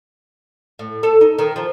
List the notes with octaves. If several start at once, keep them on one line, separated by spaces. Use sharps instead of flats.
A2
A4
D#4
D#3
F3